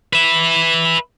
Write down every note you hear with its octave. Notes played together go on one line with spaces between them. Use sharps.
B4 E5